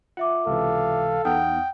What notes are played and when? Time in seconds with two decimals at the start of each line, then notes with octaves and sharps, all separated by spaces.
0.17 F4 E5 F#5 D6
0.47 C#2 C3 E3 A4 F5
1.25 E2 B3 D#4 F#5 G5 D#6 F6